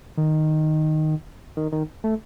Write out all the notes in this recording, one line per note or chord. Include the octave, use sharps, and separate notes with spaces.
D#3
D#3
D#3
A3